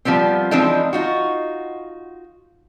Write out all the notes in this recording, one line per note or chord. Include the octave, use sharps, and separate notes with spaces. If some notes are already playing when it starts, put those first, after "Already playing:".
F3 G3 B3 C4
E3 F3 G#3 C4 D4 D#4
D#4 F4 F#4